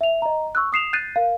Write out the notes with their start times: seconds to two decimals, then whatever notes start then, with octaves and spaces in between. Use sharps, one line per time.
0.01 E5 F7
0.22 D#5 A#5
0.55 C#6 E6 F#6
0.72 D#6 C7 E7 F7
0.93 F#6 G6 A6 C7 D#7
1.16 A#4 F5